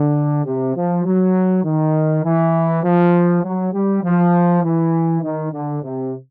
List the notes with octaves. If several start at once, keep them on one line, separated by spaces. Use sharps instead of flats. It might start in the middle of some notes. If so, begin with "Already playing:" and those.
Already playing: D3
C3
F3
F#3
D#3
E3
F3
F#3
G3
F3
E3
D#3
D3
C3